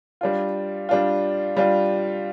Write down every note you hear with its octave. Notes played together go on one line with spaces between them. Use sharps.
G3 D4 F4
G3 D4 F4
G3 D4 F4